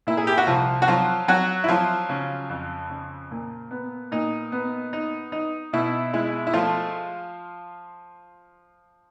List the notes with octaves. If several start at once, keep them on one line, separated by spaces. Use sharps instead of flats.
A#2 E4
G#4
G4
F#4
C2 F3 F4
F#4
F3 F#3 F4
F#3 F#4
E4
F3 F#3 F4
C#3
F2
C#3
A#2
B3
A#2 D#4
B3
D#4
D#4
B2 E4
G#3 E4
E4
F3 A3 F4